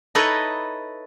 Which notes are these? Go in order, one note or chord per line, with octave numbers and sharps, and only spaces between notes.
D#4 E4 A4 B4 C#5 D#5